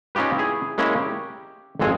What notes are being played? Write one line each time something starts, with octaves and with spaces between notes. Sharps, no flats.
C#4 D#4 F4 G4 B4
E4 G#4
G#3 A#3 C#4 E4
G4
G#1 F2 G#3 C4 G#5